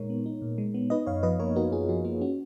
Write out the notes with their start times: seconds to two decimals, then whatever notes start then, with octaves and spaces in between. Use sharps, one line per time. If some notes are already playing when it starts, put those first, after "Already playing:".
Already playing: A#2 G#3 D#4 A#4 C#5
0.10 B3
0.26 D#4
0.42 A#2
0.58 G#3
0.74 B3
0.90 D#4 B4 D#5
1.07 F#2 C#5 F5
1.23 F3 B4 D#5
1.40 A#3 A#4 C#5
1.56 D#4 F#4 A#4
1.72 F#2 F4 G#4
1.89 F3 F#4
2.05 A#3 F4
2.21 C#4 F#4